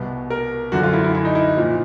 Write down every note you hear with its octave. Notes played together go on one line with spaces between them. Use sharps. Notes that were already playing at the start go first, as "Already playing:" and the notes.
Already playing: C2 B2
A#4
F#2 D3 F3 F#4
F4
E4
E4
E4
D#4
E4
A#2 F3